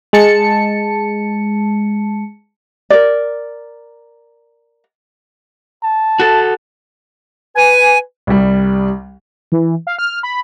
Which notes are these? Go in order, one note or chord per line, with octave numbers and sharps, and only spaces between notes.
G#3 A5 C#7
A#4 D5
A5
F#4 A4
B4 G#5
C2 G3
E3
F5
F6
B5